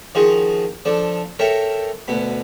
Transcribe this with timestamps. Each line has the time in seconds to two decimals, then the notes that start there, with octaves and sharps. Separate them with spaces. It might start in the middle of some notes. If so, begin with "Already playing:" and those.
0.15 D#3 F3 F4 F#4 G#4
0.85 F3 D4 A4
1.39 A4 A#4 C#5 E5 G5
2.08 D2 B2 B5